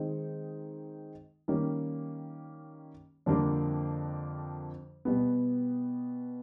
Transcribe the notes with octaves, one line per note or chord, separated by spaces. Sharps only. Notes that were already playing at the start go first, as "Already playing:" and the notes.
Already playing: D#3 G#3 C4 D#4
D#3 G3 A#3 C#4
F2 D3 G3 A#3 D4
B2 G3 B3